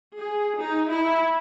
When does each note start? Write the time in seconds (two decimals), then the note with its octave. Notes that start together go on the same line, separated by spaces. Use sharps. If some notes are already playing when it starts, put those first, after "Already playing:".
0.18 G#4
0.61 D#4
0.92 E4